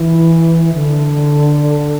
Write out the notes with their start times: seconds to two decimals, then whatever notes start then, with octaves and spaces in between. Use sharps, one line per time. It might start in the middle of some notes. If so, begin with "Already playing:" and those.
Already playing: E3
0.74 D3